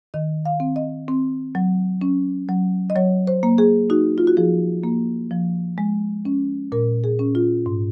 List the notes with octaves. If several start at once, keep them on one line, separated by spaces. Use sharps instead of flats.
D#3 D#5
F5
C4
D#5
C4
F#3
C#4
F#3
D#5
F#3 C#5
C5
A#3
G#4
D#4 F#4
F4
F#4
F3 G#4
A#3
F3
G#3
C#4
A#2 A#4
G#4
C#4
F4
G#2